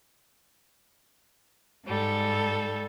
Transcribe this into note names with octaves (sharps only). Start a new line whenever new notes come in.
G#2 G3 A4